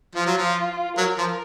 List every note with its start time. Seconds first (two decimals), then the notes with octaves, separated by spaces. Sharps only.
0.15 F3 F4
0.26 F#3
0.37 F3
0.97 F#3 A#4
1.18 F3